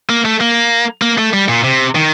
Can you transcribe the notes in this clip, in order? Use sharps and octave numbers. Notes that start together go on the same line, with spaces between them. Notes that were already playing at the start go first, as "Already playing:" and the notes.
A#3
A3
A#3
A#3
A3
G3
A#2
C3
D#3